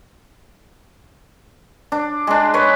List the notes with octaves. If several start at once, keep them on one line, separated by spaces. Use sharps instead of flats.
D4
G#3 D4
B4 C#5